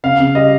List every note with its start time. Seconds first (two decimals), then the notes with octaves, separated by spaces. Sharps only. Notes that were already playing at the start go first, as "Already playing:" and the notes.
0.04 C#3 F5
0.19 C#3
0.35 G3 D#5